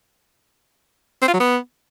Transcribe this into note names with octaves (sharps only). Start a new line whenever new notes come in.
C4
F4
F#3
B3